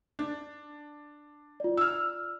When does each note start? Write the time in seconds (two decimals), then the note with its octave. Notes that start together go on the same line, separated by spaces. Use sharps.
0.19 D4
1.60 F4 D5
1.77 E6 F6